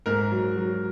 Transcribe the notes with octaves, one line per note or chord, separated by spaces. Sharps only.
G#2 A#4
F#3
F#3